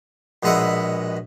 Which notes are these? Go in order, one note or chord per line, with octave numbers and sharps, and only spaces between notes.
A#1 B2 G#3 B4 E5 F#5